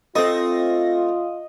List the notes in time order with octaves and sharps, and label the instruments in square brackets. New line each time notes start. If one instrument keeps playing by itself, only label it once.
[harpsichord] A3 [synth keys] C4 A#6 [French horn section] F4 [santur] D#5